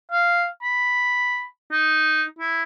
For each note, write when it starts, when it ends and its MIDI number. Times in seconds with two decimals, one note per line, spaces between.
0.12 0.46 77
0.62 1.44 83
1.72 2.24 63
2.39 2.63 64